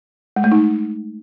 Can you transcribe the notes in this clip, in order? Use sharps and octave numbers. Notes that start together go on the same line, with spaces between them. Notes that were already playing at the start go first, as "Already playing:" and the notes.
G#3
A3
D#4